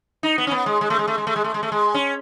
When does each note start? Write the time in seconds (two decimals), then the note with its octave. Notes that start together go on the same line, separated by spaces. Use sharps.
0.23 D#4
0.38 B3
0.47 C#4
0.51 B3
0.66 G#3
0.81 G#3
0.90 A3
0.99 G#3
1.07 A3
1.18 G#3
1.27 A3
1.36 G#3
1.44 A3
1.54 G#3
1.63 A3
1.72 G#3
1.94 C#4